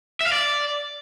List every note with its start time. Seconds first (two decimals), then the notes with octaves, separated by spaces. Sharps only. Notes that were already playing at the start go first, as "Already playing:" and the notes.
0.21 E5
0.26 F5
0.32 D5